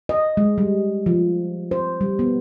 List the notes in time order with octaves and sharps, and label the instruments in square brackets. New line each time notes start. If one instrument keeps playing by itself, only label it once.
[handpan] D#5
G#3
G3
F3
C5
G3
B3